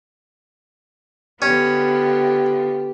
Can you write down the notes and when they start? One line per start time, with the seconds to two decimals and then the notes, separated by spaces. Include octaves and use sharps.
1.42 D3 B3 C#4 F4 G4